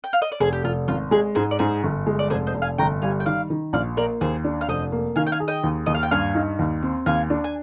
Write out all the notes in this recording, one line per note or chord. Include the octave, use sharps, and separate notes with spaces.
G5
F5
D#5
D5
F1 G#4 C5
G4
F1 F4
G#1 F4
G#3 G#4
G#2 G#4 C5
D5
G#2 G#4 C5
G1
G#3
D5
F1 G#4 C5
C5 D#5
F1
F5 G#5
G1 G5 A#5
G3 F5 G#5
G5
D#3 D5 F5
D#3
A#1 D5 F5
A#3 A#4 D5
D#2 G#4 C5
D4
F5
F1 C5 D#5
A#3
D#3 F5 G#5
G5
F5 G#5
G#4
D#5 G5
D#2
D#2 D#5
F5
G5
G2 F5 G#5
D#4
D#2
C4
D#2 F5 G#5
D4
G#5